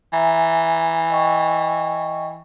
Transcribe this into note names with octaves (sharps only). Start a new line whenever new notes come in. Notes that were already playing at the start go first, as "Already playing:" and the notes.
E3 E5 G#5 A#5
D#5 G5 C#6